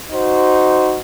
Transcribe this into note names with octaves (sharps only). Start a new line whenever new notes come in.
D#4 F#4 C5